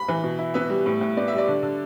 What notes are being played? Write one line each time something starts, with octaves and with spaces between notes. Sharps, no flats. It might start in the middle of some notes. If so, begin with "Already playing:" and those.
Already playing: B5
E3
B2
E4
B3 E5
G3
A2
A2
B3 D5
G3 E5
D5
D3
D3